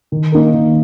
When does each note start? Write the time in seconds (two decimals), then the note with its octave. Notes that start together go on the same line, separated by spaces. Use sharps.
0.12 D#3
0.32 A#3 D#4 A#4
0.53 D#3